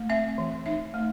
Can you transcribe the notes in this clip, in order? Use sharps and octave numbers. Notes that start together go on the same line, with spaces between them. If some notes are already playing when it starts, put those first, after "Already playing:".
Already playing: A3
C4 E5
E3
D#4 E5
A3